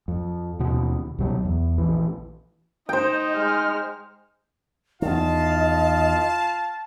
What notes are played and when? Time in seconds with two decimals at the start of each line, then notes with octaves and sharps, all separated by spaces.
0.08 F2
0.59 D#2 B2
1.18 C2 B2 E3 F#3
1.45 E2
1.78 A#1 E3
2.89 D#4 C5 D#5 G5
3.36 G#3 F6
5.02 E2 D#3 F4 D#5 F5 A5